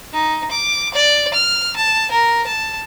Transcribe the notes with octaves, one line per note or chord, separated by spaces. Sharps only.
D#4
D6
D5
F6
A5
A#4
A5